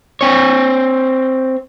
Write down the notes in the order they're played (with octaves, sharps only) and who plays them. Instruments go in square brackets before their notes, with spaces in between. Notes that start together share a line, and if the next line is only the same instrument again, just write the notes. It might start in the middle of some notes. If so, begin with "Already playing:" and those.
[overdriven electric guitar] C4 C#5